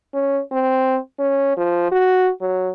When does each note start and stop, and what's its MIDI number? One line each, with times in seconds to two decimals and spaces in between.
0.14 0.41 61
0.52 0.98 60
1.19 1.53 61
1.57 1.90 53
1.92 2.31 66
2.41 2.70 54